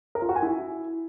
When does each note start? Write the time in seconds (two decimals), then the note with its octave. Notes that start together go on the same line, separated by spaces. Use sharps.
0.15 A#4
0.22 F4
0.29 F#4
0.36 G#5
0.42 E4